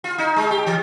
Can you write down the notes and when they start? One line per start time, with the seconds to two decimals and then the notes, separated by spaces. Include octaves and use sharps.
0.04 F4
0.18 D#4
0.36 G#3
0.51 G4
0.66 E3